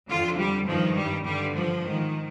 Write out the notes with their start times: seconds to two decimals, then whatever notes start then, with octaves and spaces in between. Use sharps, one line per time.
0.08 F2 D3 F4
0.38 G3
0.67 G2 D#3 F3
0.96 G3
1.24 G2 D3 G3
1.54 F3
1.82 G#2 D#3